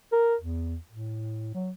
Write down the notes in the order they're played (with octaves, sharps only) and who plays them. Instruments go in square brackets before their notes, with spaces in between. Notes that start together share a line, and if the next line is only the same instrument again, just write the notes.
[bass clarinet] A#4
E2
A2
F#3